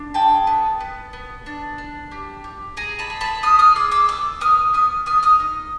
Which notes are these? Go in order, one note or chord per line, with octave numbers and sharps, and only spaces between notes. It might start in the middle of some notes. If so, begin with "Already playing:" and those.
Already playing: D4
G#4 G5 A5
B3
B3
B3
D4
D4
G4
G4
G#4 G#5 A#5
A5 B5
G#4
A5 B5
F4 D#6 F6
D#6 F6
G#4 D6 E6
D6 E6
B3 D6 E6
B3 D#6 F6
B3 D#6 F6
B3 D#6 F6
D#6 F6
D#4